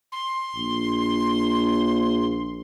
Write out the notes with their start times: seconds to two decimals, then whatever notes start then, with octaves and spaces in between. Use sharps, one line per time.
0.12 C6
0.56 A#1